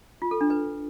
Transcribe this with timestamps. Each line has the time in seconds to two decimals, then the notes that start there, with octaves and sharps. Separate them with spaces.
0.22 F4
0.31 A4
0.41 D4
0.50 B4